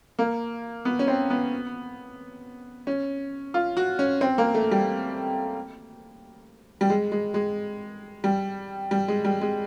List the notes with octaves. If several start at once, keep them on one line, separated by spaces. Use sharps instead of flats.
A#3
B3
C#4
C4
B3
C#4
F4
F#4
C#4
C4
A#3
A3
G3
G3
G#3
G#3
G#3
G3
G3
G#3
G3
G#3